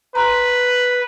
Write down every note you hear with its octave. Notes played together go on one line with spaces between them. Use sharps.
B4 A#5 C6 F#6